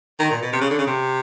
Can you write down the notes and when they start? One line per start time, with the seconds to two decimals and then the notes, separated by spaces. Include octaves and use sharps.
0.19 D#3
0.31 A#2
0.42 B2
0.53 C3
0.61 C#3
0.70 D3
0.78 C#3
0.87 C3